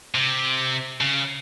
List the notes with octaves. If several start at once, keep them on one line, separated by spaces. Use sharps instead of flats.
C3
C#3